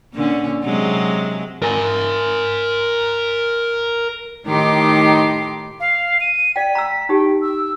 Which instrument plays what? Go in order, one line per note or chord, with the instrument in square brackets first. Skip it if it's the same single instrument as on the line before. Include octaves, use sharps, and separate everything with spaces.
[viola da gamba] A#2 D3 C#4
C3 F#3 G#3
[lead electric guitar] A#4 G#5
[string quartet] A2 D#3 D#4 G4 C6 D6
[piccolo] F5
D#7
[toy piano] D5 G5 [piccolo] B6
[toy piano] A#5 E6
[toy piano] D#4 G4 [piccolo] G5
[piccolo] E6